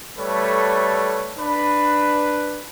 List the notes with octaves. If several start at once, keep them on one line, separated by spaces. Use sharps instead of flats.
G3 A3 A4 B4 C#5
D4 B4